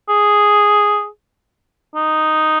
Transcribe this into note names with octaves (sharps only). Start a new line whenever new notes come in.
G#4
D#4